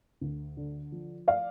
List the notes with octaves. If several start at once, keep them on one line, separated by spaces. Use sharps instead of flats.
D2
D3
F3
D5 F5